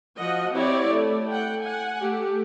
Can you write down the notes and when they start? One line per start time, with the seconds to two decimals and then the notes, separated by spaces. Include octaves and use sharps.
0.19 F3 F#4 D#5 F#5
0.54 C4 E4 G4 C#5 D5
0.91 A3
1.29 F#5 G5
1.62 F#5 G#5
2.01 A3 G4